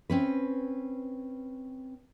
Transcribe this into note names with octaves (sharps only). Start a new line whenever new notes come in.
C4 C#4 B4